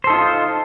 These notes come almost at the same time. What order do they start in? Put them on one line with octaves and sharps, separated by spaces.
C5 A4 D#4 F4